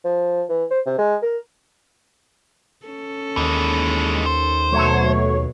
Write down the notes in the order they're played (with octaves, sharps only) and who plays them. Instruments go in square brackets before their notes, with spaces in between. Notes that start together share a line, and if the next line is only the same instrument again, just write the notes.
[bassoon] F3
E3
C5
C3
G#3
A#4
[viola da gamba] C#4 A4
[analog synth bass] D#2 [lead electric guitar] E3 G#3
[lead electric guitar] C5
[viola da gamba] B2 [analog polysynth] F#3 A3 C#5